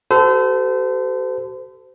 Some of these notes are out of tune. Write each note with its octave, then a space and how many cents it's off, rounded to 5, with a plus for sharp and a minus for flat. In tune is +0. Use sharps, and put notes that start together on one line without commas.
F#4 +45 A4 +0 C5 -35